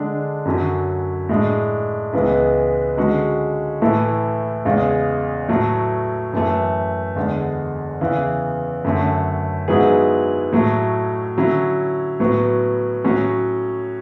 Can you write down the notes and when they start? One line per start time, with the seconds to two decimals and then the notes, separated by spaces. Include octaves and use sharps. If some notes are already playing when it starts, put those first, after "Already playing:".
Already playing: D3 G#3 D4
0.45 F#2 D3 F#3 C#4
1.29 A2 G#3 D4
2.13 C#2 C#3 E3 G#3 B3
2.97 D3 G#3 C#4 F#4
3.82 A2 E3 A3 E4 A4
4.65 E2 C#3 G#3
5.49 A2 F#3 A3
6.33 F#2 E3 A3
7.16 E2 D3 G#3
8.01 E2 C#3 E3
8.84 F#2 D3 A3 C#4
9.68 G#2 F#3 B3 E4 G#4
10.52 A2 F#3 A3
11.37 D3 F#3 C#4 E4
12.20 A2 F#3 B3 F#4
13.04 A2 F#3 C#4 F#4